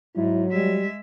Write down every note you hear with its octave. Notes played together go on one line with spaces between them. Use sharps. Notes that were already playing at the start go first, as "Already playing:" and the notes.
G#2 F#3 E4
G3 G#3 E5